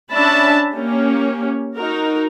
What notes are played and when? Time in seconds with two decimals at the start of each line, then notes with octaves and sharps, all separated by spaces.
0.12 C#4 D4 E5 A5 B5
0.74 A#3 C#4 G4
1.76 D#4 F#4 A#4